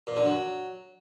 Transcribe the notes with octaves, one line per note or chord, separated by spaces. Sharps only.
A#2
D3
F#3